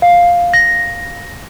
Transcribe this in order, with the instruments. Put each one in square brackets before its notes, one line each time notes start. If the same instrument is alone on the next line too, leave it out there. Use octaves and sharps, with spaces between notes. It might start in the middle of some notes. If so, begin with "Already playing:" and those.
[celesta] F5
A#6